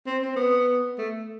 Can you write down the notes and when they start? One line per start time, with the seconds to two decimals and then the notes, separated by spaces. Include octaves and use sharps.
0.06 C4
0.22 C4
0.36 B3
0.98 A3